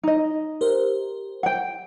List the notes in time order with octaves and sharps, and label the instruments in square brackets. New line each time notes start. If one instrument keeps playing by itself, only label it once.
[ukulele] D#4 D#5
[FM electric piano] G4 A#4 C5
[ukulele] F#5 G5